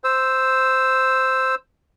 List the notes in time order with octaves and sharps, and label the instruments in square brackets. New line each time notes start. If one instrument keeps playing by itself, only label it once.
[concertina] C5 E6